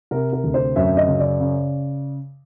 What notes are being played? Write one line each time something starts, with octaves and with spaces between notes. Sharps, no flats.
C3 A#4
A#4
D2
C5
F#2 E5
D#5
C#3
D5
C#3